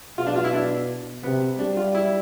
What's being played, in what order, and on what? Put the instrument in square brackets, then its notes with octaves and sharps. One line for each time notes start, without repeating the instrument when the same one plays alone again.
[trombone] B2 [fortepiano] F4
[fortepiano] D4
F4
E4
D4
[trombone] C3 [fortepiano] B3
[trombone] G3 [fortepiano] D4
[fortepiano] F4
E4